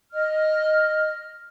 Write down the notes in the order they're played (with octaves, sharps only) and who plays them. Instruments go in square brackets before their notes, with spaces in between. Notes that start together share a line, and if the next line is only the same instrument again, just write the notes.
[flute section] D#5 F6